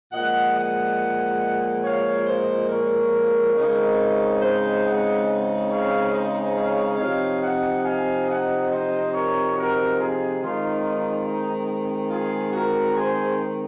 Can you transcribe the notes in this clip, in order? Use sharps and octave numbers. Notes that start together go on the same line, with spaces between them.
A#2 F3 G#3 D#5 F#5
D#5 F#5
C#5 F5
C5 D#5
A#4 C#5
C#3 G#3 C4 D#4
C5 D#5
D#5 F#5
C#5 F5
C5 D#5
C#5 F5
C3 F3 C4 D#4 C#5 F5
D#5 F#5
F5 G#5
D#5 F#5
C5 D#5
A#4 C#5
F#4 A#4
F4 G#4
D#3 G#3 C4 D#4 F4
F4
D#4
F4 G#4
F#4 A#4
G#4 C5